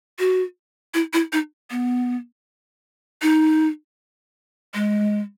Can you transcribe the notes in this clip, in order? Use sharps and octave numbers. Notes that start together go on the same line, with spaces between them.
F#4
E4
E4
D#4
B3
D#4
G#3